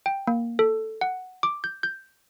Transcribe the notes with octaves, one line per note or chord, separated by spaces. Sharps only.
G5
A#3
A4
F#5
D6
G6
G6